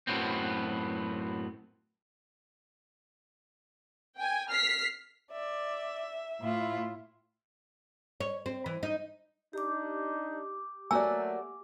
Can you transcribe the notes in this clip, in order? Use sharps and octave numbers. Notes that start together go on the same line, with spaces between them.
F#2 A2 F3 F#3 B3 C4
G5 G#5
F6 B6 C7
D5 E5
A2 E4 F4
C#5
C4
E3
D#4
D4 D#4 G4 D6
F#3 A3 A#3 F#4 D5 G#5 A#5 E6